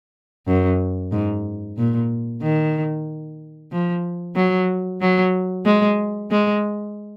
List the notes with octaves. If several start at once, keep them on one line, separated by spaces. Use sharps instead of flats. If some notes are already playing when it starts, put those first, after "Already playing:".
F#2
G#2
A#2
D#3
F3
F#3
F#3
G#3
G#3